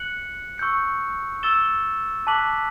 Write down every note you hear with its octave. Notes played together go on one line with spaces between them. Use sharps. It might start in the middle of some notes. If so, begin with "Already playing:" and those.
Already playing: F#6 C#7 F#7
C#6 E6 G6 C#7
E6 A6 E7 G7
A5 D6 F#6 B6 F#7